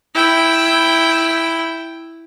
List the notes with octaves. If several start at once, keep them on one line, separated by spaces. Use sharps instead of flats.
E4 G5